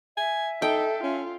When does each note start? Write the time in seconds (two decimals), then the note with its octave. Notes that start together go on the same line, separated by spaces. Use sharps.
0.17 E5 G#5
0.62 D#4 A4 G5
1.03 C#4 F4